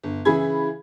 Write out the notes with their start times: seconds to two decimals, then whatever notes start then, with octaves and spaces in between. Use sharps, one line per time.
0.03 G1
0.25 C#3 E3 E4 G#4 B5 G#6